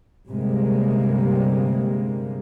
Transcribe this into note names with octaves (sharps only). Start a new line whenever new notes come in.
G1 C3 G3 G#3 A#3